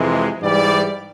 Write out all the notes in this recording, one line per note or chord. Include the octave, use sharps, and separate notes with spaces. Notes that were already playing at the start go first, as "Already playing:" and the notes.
Already playing: F2 C3 E3 G#3
G#2 E3 G3 D5